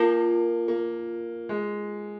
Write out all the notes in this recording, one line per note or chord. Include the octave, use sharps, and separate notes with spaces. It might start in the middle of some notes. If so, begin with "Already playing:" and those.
Already playing: A#3 F4 A#4 G#5
A#3
G#3